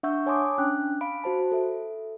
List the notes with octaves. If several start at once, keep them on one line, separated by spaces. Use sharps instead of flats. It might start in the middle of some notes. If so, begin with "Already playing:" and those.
D4 E5 F#5 C#6 E6 G6
C#5 G#5 A5 C6 D6 D#6
C#4 D4 G5 F#6
F5 B5 D7
F#4 C5 A5
A4 E5